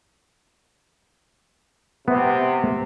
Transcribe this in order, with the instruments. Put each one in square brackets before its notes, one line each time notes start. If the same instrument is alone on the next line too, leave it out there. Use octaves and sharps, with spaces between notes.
[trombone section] C3 [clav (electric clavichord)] B3